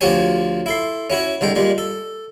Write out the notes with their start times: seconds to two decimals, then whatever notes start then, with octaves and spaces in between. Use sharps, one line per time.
0.01 D2 F3 F#4 G4 C#5 G#5
0.66 E4 A4 C6
1.10 C#4 E4 F#4 C#5
1.41 C2 D3 G#3 G5
1.55 A#2 G3 G#3
1.78 A4